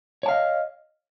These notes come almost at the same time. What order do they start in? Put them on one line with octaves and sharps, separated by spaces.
C#5 A5 F5 D#5